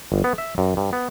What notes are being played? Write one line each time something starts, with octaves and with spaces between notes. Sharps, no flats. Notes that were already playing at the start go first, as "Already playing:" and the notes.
G1
B3
E5
F#2
G2
B3